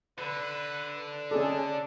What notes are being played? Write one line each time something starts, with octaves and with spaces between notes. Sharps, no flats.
D3 B4
C#4 D4 G#4 A4